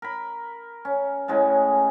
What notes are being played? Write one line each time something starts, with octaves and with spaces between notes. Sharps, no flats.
A#4 B5
C#4
A2 C#3 G#3 D#5